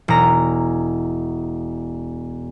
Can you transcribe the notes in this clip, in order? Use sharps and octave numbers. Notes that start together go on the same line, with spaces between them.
E1 A#5